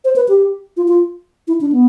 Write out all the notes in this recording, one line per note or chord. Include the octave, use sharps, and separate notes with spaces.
C5
B4
G4
F4
F4
E4
D4
B3